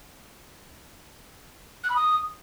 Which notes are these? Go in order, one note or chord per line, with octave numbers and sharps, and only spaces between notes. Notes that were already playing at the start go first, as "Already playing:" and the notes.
F#6
B5
D#6